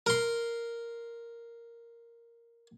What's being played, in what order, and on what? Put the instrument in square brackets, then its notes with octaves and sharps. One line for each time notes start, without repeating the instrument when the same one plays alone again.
[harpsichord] A#4 C6